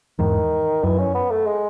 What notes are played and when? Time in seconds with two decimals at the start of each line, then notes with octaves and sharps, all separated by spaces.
0.19 E2 G#2 D#3
0.83 F#2 E3
0.99 C#4
1.14 B3
1.31 A3
1.46 G#3